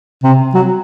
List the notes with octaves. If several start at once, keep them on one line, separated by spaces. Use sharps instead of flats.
C3
F#3